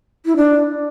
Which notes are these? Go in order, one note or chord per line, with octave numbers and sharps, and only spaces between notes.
E4
D4